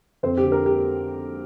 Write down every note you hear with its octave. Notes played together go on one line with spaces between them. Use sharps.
F2 C4 C5
D3 G4
A#4
G4